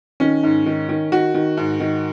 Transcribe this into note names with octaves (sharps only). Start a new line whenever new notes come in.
D#3 C#4
G#2
D#3
D#3
D#3 F#4
D#3
G#2
D#3